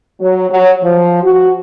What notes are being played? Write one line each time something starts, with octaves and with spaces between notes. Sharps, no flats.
F#3
F#3
F3
F#4